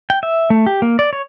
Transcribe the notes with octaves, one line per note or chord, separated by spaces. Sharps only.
G5
E5
A3
G4
A#3
D5
C#5